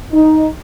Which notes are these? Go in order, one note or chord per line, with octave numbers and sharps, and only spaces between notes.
D#4